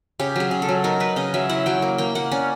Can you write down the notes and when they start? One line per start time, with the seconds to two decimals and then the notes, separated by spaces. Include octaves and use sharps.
0.19 C#3 G4
0.36 F#3 G#4
0.51 C#3
0.62 A4
0.69 F#3
0.84 D#4 A#4
1.00 D#4 B4
1.16 C#3 D#5
1.34 F#3 E5
1.49 E4 F#5
1.66 F#3 G5
1.82 A#3
1.98 A#3 G5
2.15 A#3 F#5
2.32 C#4 D5